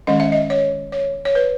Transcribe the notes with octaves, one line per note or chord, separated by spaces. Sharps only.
D#3 G#3 C#4 D#5
E5
D#5
C#5
C#5
C#5
B4